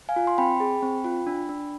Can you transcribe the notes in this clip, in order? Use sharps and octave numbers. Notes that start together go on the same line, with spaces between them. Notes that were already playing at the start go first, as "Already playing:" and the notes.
F5 G#5
F4
C6
C4 G5 B5
G#4
C4
F4
D4
D4